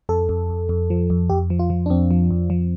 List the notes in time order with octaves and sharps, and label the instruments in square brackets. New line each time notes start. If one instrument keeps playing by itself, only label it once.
[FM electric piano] F2 A4
F2
F2
F2
F3
F2
F2 G4
F3
F4
F3
D4
F2 C4
F3
F2
F3